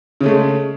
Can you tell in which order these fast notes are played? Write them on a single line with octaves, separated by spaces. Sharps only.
C#3 C#4 A3 G#3